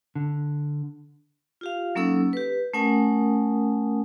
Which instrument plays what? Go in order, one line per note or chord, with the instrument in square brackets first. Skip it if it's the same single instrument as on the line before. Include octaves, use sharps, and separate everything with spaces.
[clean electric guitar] D3
[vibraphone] F4 G4 F5
F#3 A#3 C#4 D#4 A4 E6
G4 B4
A3 C#4 A#4 F#5 G#5 D#6